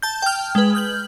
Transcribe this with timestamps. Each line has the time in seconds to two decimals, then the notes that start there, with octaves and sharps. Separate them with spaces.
0.02 A5 G6
0.22 G5 F6
0.55 G#3 B4
0.75 F6 G6 F#7